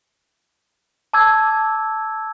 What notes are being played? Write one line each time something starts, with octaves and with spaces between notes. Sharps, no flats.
A5 D6 E6 G#6